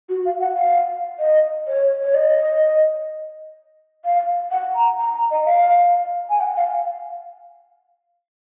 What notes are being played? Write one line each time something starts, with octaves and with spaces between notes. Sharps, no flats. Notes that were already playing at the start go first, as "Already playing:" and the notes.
F#4
F5
F#5
F5
D#5
C#5
C#5
D#5
F5
F#5
A#5
A#5
A#5
D#5
F5
G#5
F#5
F5